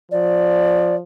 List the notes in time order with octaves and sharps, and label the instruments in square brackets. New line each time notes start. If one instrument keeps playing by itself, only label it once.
[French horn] F3 [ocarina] D5